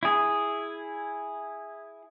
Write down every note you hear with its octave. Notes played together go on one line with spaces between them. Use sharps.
E4 G#4